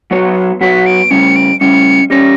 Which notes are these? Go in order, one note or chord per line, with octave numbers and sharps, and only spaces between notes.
F#3 B3 F#4 C#5
F#3 B3 F#4 C#5 B6
D7
C#3 G3 C#4 C#7
D7
C#3 G3 C#4 C#7
G3 C#4 G4 C#5 A#6